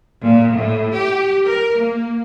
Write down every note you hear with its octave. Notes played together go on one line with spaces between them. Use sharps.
A#2
A2
G4
A#4
A#3